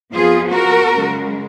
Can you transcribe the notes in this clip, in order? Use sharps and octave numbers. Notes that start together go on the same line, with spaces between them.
F2 F3 B3 F4 G#4
F#4 A#4
F#2 C#3 G#3